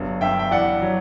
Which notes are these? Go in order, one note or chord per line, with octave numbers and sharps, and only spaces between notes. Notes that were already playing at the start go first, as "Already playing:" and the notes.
Already playing: G1 F#3
G2 E5 G5
G5
E3 D5 F#5
F#3